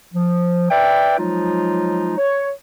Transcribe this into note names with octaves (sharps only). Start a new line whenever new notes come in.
F3
B4 D5 E5 G5
F3 F#3 G#3 D#4 F4
C#5